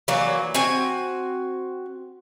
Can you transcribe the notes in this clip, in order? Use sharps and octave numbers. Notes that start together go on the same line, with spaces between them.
E3 F#3 A#3 D5
C4 F#4 G#5